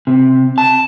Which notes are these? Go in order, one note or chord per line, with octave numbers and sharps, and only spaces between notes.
C3
A5